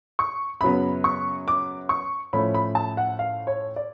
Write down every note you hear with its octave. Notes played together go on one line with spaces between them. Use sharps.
C#6
F#2 C#3 F#3 B3 B5
C#6
D6
C#6
A2 F3 A3 C#4 B5
B5
A5
F#5
F5
C#5
D5